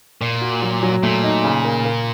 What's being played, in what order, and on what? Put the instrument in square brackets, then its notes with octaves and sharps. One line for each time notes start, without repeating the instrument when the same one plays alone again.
[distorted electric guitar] A#2 [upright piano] A#3
[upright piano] F#4
F#3
F#3
[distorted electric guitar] A#2 [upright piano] A3
[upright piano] D#4
C#3
A#3
A#3